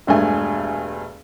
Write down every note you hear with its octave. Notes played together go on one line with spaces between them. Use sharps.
E1 G2 A3 G#5